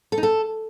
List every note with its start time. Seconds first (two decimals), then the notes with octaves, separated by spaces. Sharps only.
0.12 A4
0.18 D#4
0.23 A4